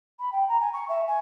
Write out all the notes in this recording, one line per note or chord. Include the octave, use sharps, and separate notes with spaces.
B5
G5
A#5
G#5
C#6
E5
G#5